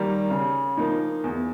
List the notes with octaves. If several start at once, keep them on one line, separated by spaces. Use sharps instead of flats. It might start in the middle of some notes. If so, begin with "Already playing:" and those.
Already playing: D#3 G3 A#3
C#3
F3 A#3 D#4
E2